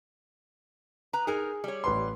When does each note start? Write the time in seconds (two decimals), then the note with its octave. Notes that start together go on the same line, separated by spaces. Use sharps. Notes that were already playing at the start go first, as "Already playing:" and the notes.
1.13 B4 A#5
1.27 D#4 G#4 A#4 G#5
1.64 G3 C#5
1.84 A1 B4 C6